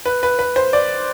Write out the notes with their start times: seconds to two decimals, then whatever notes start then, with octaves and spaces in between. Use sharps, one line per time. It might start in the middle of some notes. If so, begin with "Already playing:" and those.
0.06 B4
0.23 B4
0.39 B4
0.56 C5
0.73 D5